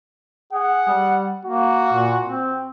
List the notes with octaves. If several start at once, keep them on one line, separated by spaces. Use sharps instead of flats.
G#4 F#5
G3
A#3 F#4
A#2
C4